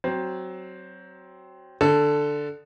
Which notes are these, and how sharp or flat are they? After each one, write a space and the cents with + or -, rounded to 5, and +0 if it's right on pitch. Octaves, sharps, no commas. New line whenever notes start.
F#3 +15 C4 +0
D3 +5 A4 +0